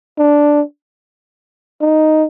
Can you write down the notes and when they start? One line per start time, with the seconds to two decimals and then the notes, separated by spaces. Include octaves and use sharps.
0.18 D4
1.81 D#4